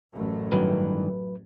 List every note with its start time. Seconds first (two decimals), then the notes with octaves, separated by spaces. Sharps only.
0.12 A1 F#2 A3
0.52 G2 D#3 E3 F#3 B4